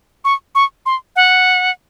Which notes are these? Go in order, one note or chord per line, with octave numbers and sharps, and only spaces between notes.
C#6
C#6
C6
F#5